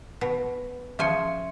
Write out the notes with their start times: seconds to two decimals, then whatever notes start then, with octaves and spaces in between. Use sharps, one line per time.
0.21 B2
0.99 C#3 F3 E5 G#5 C6 C#7